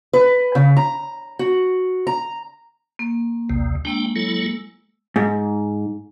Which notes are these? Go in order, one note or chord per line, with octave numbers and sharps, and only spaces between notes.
B4
C#3
A#5
F#4
A#5
A#3
A#1 D#2 C3
G#3 A#3 D4 G5 E6
F#3 E4 A4
G#2